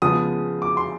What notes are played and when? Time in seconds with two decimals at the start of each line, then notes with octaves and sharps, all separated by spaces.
0.02 C#3 F3 G#3 B3 D#6
0.62 D6
0.77 C6